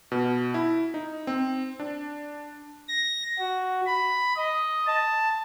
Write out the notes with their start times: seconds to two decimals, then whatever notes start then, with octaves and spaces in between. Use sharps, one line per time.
0.12 B2
0.54 E4
0.94 D#4
1.27 C4
1.80 D4
2.89 A#6
3.39 F#4
3.86 B5
4.36 D#5
4.87 A5